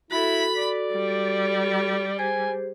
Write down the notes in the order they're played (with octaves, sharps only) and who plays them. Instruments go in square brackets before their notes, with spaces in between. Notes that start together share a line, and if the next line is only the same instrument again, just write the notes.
[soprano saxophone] E4 [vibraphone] F#4 A4 [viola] B5
[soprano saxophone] D5
[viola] G3
[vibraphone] G4 G#4 C5 [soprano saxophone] G#5